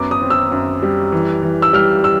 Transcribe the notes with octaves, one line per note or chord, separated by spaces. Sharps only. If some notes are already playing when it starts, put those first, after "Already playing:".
Already playing: F#2 B3 D6
D#6
C4
E6
F#2
G3
E3
E3
E6
G3 F6
E6